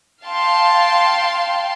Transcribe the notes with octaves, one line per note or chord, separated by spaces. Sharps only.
F5 G5 A5 C6